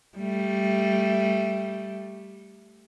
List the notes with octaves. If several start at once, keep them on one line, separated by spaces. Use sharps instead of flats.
G3 A3